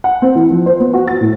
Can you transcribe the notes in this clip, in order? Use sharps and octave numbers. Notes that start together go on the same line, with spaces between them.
F#5
C4
E3
F3
C5
B3
F#4
A6
A2